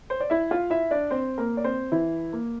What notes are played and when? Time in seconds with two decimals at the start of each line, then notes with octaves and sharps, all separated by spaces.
0.10 C5
0.20 D5
0.30 E4 E5
0.51 F4 F5
0.70 E4 E5
0.91 D4 D5
1.11 C4 C5
1.38 A#3 A#4
1.57 D5
1.64 C4 C5
1.92 E3 E4
2.33 A#3